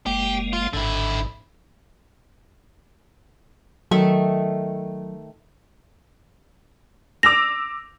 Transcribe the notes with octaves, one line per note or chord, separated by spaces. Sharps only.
F#1 G#3 A#3 G4
F4
G#1 G#2 D3 E4
D#3 F#3 A3 E5
D6 E6 A#6 F7